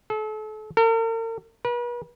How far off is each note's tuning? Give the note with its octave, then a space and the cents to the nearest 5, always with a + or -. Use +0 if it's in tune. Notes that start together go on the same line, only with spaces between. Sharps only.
A4 -35
A#4 -45
B4 -40